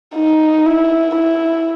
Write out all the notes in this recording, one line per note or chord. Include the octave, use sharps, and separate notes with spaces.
D#4
E4
E4